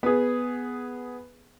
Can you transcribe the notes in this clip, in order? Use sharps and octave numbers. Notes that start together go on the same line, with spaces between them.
B3 G#4